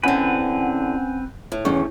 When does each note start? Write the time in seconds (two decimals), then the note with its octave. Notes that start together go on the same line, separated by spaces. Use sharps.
0.03 E2 D3 C4 C#4 B4 F#5 G#5
1.52 A2
1.65 E2 C#4 C#6